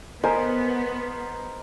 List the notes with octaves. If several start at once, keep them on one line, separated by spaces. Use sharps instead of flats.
B3 A#4 C5 D#5 G#5